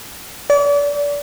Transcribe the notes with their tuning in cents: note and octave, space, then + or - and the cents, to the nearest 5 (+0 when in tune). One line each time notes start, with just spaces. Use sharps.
D5 -35